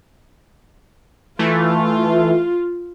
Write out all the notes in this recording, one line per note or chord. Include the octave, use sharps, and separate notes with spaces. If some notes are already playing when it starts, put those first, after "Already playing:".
E3 A3 F4